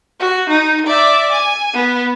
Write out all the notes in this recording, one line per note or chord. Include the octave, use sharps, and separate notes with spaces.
F#4
D#4
D5 E5
G#5
B3